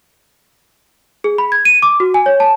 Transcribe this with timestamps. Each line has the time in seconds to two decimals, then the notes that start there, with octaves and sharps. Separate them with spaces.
1.24 G#4
1.38 B5
1.52 G#6
1.65 D#7
1.82 D6
2.00 F#4
2.14 G#5
2.26 C#5
2.40 A5